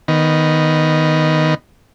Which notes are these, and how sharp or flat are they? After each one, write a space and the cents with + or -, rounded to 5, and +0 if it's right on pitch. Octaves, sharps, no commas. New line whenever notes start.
D#3 +0 B3 +0